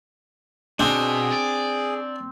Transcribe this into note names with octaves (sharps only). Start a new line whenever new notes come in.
B2 C4 D4 G#4
D5